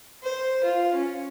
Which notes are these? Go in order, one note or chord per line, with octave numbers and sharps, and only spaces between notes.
C5
F4
C#4